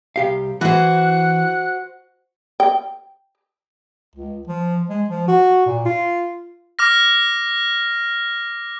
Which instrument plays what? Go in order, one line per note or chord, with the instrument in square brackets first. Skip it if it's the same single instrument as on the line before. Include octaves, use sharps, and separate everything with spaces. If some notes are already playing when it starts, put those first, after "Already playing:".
[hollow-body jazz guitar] C2 G4 F5
[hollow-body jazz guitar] E3 E4 [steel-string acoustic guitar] F#4 C5 [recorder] F#6
[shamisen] G5
[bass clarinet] C#2
F3
G#3
F3
F#4
A#2
F4
[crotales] D6 F6 A#6